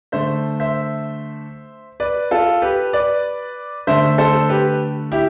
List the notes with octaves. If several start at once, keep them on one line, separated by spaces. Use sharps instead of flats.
D3 A3 C5 E5
C5 E5
B4 D5
F4 A4
G4 B4
B4 D5
D3 A3 C5 E5
A4 C5
G4 B4
E4 G4